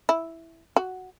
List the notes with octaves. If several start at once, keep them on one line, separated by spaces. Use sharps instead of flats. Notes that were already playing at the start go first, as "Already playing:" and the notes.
E4
F#4